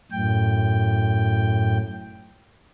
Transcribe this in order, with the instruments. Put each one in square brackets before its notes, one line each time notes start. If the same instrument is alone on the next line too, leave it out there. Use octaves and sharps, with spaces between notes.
[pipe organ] F#2 A2 G5